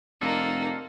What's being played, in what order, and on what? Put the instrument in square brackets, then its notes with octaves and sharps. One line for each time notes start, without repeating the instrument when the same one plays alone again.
[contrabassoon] F1 [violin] A#3 D#4 [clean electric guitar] D4 F4 A4